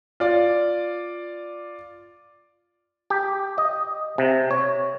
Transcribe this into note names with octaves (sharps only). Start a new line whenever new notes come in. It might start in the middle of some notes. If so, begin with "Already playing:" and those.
F4 D5
G4
D#5
C3
C#5